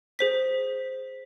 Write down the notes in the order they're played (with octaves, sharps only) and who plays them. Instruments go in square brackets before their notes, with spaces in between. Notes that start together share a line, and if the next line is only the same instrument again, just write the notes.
[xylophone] G#4 C5 B6